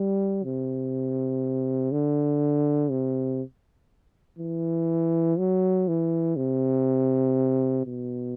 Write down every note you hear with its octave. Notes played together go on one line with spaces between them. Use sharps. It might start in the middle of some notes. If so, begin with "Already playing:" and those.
Already playing: G3
C3
D3
C3
E3
F#3
E3
C3
B2